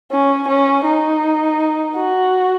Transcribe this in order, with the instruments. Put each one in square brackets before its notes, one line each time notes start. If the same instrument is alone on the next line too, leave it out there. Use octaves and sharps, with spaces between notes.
[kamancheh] C#4
C#4
D#4
F#4